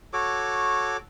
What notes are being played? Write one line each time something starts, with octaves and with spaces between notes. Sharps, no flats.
F#4 A4 C#5 D6